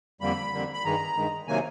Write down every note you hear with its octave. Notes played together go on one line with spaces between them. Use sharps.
F2 D3 G3 A#3 B5
F2 D3 G3 A#3
B5
G2 D#3 G#3 A#5
G2 D#3 G#3
C3 D#3 F#3 A#3 G#5